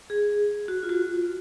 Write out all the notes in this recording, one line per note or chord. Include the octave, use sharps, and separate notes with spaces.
G#4
F#4
F4
F#4